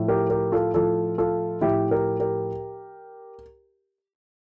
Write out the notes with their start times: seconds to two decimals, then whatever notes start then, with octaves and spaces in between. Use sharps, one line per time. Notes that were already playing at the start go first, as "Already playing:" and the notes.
Already playing: A2 F3
0.08 G4 A#4
0.30 G4 A#4
0.52 F4 A4
0.74 A2 F3 F4 A4
1.18 F4 A4
1.61 A2 F3 E4 G4
1.91 G4 A#4
2.20 G4 A#4